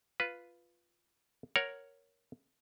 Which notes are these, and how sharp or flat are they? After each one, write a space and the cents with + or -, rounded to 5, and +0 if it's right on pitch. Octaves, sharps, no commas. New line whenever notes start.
F4 -5 B4 +0
A#4 +0 C#5 +0 F#5 +0